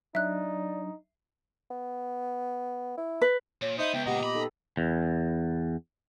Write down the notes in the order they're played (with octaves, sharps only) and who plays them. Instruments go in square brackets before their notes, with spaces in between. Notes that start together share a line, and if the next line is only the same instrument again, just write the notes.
[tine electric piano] F#3 D4 [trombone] D#4 [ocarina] D5 [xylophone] E5 F#6
[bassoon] B3
E4
[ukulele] B4
[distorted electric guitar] A#2 [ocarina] C#5
[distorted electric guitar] B3 [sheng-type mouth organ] D#4 C5 D#6 [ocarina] E5
[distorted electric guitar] C#2 [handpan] B3 [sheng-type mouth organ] G5
[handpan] A#2 G4 [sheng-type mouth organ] D#5 A#5 [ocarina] F#5
[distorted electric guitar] B5 [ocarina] D6
[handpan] D#4 A4
[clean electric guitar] E2